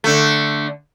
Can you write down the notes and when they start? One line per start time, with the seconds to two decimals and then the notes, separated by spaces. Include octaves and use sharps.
0.04 D3 A3